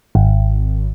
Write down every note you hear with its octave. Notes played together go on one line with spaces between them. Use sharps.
G#1